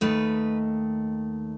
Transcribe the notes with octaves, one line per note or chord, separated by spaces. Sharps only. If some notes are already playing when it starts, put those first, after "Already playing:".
D#2 D#3 A3 B4